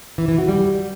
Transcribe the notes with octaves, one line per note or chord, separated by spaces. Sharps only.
E3
E3
F#4
G3